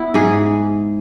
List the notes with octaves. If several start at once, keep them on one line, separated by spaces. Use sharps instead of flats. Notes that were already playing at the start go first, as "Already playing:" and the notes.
Already playing: B3 E4
G#2 G#4